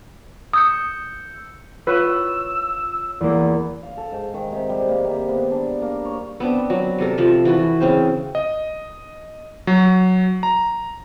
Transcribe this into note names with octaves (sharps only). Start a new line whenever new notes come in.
D#6 E6 G6 C#7
F4 B4 C#5 E6
E2 A#3
F5
A4
G#2
D#3
C3
G3
A#3
C3
B3
D4
A#3
C#5
B3 C4 D4
F#3
C3 G3 A4 A#4
C3 F3 A5
E3 F#4 B4
C#3 C4 C5
D#5
F#3
A#5